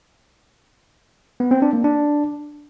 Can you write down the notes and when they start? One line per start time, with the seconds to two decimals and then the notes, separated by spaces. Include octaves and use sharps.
1.40 B3
1.51 C4
1.62 D4
1.73 A#3
1.84 D4